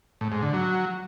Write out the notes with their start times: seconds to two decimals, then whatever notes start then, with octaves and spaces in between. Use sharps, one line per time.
0.21 A2
0.32 G#2
0.42 D3
0.53 F#3